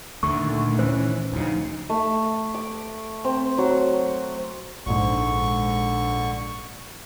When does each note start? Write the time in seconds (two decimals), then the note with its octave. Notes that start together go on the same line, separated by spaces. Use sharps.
0.23 D2 A#2 D3 D#3 A3 C#6
0.79 E3 C#4 C5
1.32 D2 C#3 F3 D#4
1.89 A3
2.54 D6
3.25 C4
3.58 F#3
4.86 A#1 G#2 D3 C#6